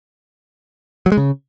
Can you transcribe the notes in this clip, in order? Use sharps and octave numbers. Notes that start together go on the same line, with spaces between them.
F#3
G#3
C#3